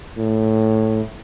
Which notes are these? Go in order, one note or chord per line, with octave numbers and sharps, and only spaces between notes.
A2